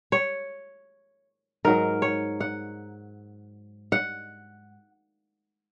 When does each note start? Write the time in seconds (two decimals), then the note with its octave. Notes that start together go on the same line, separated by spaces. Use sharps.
0.12 C#5
1.65 G#2 F#3 A#4
2.02 C#5
2.40 F#5
3.92 F#5